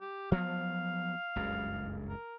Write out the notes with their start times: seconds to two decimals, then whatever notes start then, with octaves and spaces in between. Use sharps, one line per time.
0.01 G4
0.32 F3 F#3 B3 F5
1.36 F#1 C#2 G2
2.09 A#4